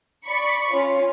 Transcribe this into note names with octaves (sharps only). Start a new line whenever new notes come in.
D5 B5 C#6
C#4 F4 C#5